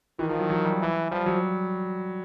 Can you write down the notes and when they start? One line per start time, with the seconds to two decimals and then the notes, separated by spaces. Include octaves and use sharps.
0.19 D#3 E3
0.29 F3
0.40 F#3
0.50 F#3
0.65 G3
0.81 E3
1.11 F3 G3
1.26 F#3